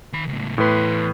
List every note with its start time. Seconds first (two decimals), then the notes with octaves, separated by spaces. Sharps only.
0.13 D#3 B5
0.28 C#2 A2
0.58 E2 A2 B4 C6